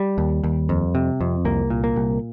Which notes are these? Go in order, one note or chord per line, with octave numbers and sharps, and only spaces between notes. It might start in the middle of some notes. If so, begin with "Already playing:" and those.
Already playing: G3
D#2
D#2
F2
C3
F2
C2 A#3
A#2
A#3
C2